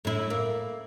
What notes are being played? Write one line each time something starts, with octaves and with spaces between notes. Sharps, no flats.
A2 E4
A#3